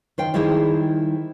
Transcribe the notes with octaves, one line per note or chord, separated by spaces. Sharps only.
D#3 C5 G5
D#3 G3 E4 G#4 C5